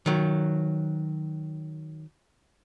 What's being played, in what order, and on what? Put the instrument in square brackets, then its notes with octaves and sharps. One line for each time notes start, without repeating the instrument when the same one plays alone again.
[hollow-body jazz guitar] D#3 F#3